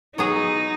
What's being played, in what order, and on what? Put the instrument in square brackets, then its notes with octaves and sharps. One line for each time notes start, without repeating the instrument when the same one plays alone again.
[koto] F#3 B3 G#4 [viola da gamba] D#4